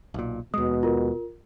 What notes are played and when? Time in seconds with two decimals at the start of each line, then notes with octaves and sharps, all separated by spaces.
0.14 B1 A#2
0.54 D#2 B2 G#3 D#6
0.83 F4 A#4